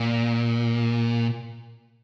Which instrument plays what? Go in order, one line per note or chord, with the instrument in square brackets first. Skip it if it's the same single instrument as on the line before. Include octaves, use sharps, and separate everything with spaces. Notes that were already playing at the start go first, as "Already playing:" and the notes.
Already playing: [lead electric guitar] A#2